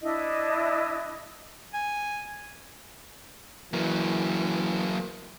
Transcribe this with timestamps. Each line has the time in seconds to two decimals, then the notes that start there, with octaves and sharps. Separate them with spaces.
0.01 D4 E4 D#5
1.74 G#5
3.73 E3 F#3 A#3